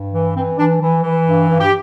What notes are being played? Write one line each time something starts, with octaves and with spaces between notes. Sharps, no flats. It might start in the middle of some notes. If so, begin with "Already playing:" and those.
Already playing: G2
E3
E3 C4
E3 D4
E3
E3
G2
G2
G4